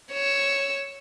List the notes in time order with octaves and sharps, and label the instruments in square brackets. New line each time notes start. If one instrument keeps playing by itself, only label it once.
[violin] C#5 E6